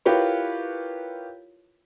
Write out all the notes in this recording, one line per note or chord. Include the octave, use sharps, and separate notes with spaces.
E4 F4 G4 A#4 B4 C#5